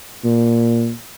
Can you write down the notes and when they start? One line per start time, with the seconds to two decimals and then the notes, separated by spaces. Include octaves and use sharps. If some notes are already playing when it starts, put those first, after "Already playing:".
0.24 A#2